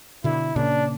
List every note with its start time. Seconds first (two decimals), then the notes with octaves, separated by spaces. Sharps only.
0.24 B2 D3 E4
0.56 A#2 C#3 D4